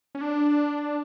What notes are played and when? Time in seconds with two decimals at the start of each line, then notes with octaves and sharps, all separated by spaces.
0.15 C#4
0.21 D4